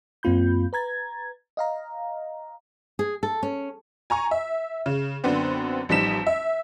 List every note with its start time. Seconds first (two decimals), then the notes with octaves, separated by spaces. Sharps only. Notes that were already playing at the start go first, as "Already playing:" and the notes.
0.23 F#2 A#3 C4 F4 B5 G6
0.73 B4 A#5 G#6 A6
1.57 D#5 F5 A#5
2.99 G#4
3.23 A4
3.43 C#4
4.10 G#5 A#5 C#6
4.31 E5
4.86 C#3
5.24 F#2 D3 B3 C4 D4
5.89 A1 F3 G3 D#4 B6 E7
6.27 E5